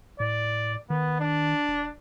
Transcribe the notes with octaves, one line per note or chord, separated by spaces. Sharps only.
A2 D5
D#3 B3
D4
E1